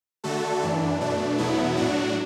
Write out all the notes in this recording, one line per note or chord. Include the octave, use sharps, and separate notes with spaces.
D3 A3 F#4 A4
F#2 E3 D4
B2 A3 D4
E2 B2 F#3 B3 E4
A2 F#3 D4 F#4